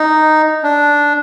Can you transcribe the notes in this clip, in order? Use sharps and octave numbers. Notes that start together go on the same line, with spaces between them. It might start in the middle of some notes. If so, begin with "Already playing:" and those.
Already playing: D#4
D4